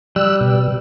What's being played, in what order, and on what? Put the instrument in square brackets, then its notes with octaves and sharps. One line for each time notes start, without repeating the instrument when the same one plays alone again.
[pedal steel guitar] G3 [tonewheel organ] E6 F#6
[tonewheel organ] B2